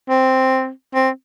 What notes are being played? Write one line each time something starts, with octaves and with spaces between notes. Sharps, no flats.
C4
C4